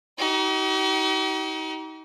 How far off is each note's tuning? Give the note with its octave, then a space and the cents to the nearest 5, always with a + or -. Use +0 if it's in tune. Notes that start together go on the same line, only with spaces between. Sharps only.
D#4 +35 G4 -45